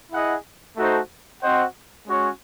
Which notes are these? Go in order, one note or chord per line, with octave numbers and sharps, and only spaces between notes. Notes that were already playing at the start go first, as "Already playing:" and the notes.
E4 G#4 D#5 F#5
A3 D#4 F#4 A4 C5
C4 F#4 C5 D#5 F#5
G#3 C#4 F#4 C#5